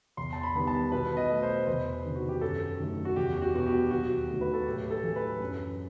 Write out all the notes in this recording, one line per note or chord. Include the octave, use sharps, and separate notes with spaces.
E2 C6
A5
B5
D#3 G3 B3
A5
B2 B4
D#5
A3
C5
E2 B4
C3 D#3
F#4
G4
F#2 A4
D#3 A3
F#4
E2 G4
G4
F#4
B2 F#3 B3 F#4
G4
D#2 F#4
D#3 F#3 A3
B4
A4
A2 G4
A4
E3 A3
B4
F#2